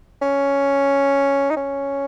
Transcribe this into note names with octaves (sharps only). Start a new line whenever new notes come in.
C#4
D#4
C#4